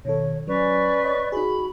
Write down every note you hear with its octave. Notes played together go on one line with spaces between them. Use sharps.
B2 D#3 A4 C#5
F#3 C#4 B4 D5 C#6
C#5 D#5
D#4 F#4 G#4 B5